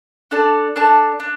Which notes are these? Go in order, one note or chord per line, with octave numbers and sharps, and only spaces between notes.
D4 A4 D5 A5
D4 A4 D5 A5
D4